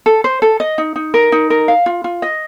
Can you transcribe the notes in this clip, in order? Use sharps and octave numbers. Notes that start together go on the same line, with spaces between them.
A4
C5
A4
D#5
D#4
D#4
A#4
D#4
A#4
F5
F4
F4
D#5